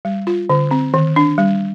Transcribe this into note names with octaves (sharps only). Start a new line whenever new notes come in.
G3
F4
D3
C4
D#3
D4
G3